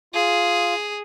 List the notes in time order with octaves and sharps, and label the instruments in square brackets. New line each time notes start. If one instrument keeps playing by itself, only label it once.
[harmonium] F4 [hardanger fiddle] G#4